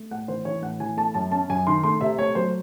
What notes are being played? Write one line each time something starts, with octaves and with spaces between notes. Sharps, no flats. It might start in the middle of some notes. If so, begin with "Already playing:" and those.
Already playing: A3
A2 F#5
E3 C5
E3 C#5
A2 F#5
E3 G#5
A3 A5
F#2 A5
C#4 A5
F#2 G#5
D#3 C6
A3 C6
C3 E5
A3 C#5
F#3 C5